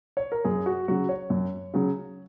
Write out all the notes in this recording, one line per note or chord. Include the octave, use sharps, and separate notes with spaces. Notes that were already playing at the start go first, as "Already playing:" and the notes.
C#5
A#4
F#2 G#4
F#4
C#3 F#3 F#4
C#5
F#2
C#3 F#3